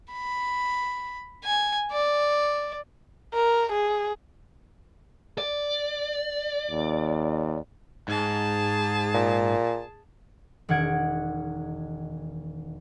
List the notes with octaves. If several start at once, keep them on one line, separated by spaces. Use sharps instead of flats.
B5
G#5
D5
A#4
G#4
D5
D#2
G#2 G#4 A5
A#2
E1 D#3 F#5 G#6 D7